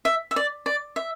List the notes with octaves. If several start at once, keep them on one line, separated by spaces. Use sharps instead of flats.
E5
E5
D5
D5
E5